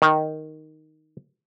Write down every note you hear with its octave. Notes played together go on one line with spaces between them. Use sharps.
D#3